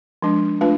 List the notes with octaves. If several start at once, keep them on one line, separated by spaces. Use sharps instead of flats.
F3 G#3 D4
A3 D4 F4 B4